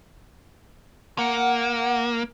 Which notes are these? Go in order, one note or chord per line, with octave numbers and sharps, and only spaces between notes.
A#3 F#5